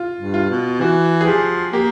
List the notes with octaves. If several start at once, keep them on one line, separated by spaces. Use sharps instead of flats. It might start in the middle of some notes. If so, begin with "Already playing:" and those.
Already playing: F4
G2
F4
B2
E3 F#4
G#4
F3 G4
A#3 G4